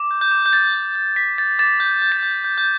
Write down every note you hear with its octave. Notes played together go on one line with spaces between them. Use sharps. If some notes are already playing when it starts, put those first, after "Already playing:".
Already playing: D6
G6
G6
D6
G6
D6 A6
G6
G6
G6 B6
G6 A6
D6 A6
G6
G6
A6
G6
G6
G6